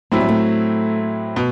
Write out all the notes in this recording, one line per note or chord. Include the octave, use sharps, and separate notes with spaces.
A2 F#3 A3 C4 E4
G3
A3
B2